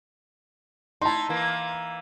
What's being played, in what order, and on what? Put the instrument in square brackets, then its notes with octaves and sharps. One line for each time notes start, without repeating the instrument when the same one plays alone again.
[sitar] D#4 E4 [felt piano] A5 C6
[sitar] E3 A#3